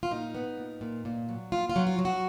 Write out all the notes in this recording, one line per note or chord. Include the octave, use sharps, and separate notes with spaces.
F4
A#2 D#4
B3
A#2
A#2
A#2
F#3
A#2 F4
F4
F#3
F4
F#3
F#4